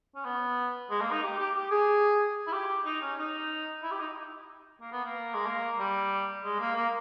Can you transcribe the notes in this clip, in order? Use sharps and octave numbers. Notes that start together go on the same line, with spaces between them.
C#4
B3
G#3
A#3
D#4
G4
G4
G4
G#4
E4
G4
D#4
C#4
D#4
E4
G4
D#4
A#3
B3
A#3
G#3
A#3
G3
G#3
A#3
A#3